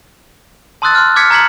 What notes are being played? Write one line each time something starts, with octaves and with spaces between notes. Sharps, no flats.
A5 C6 D#6 E6 F#6 A6
C6 F6
D6 F6 G#6 B6 C#7
A#5 C#6 G#6 B6 C#7 F#7